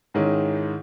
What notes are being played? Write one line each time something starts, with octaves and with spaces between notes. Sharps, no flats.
G#2 D#3 G#3 C#4 E4